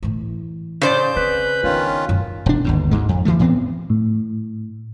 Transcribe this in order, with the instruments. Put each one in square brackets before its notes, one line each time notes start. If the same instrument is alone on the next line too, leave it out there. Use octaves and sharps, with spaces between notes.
[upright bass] A2 E3
[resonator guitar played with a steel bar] C#3 C5 D5 [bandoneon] G6
[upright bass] C4 [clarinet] B4
[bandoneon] D#3 C#4 F4 [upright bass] B3 D4
[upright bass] F#2 D#3
[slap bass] E1 D4
G1 D#2 G#2
D2 G#2 G#3
F2
E3 F3 A3
A2 E3 B3 C4
[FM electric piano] A2